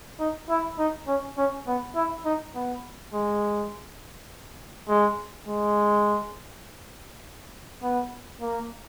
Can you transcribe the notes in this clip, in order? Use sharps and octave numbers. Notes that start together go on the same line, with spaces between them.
D#4
E4
D#4
C#4
C#4
B3
E4
D#4
B3
G#3
G#3
G#3
B3
A#3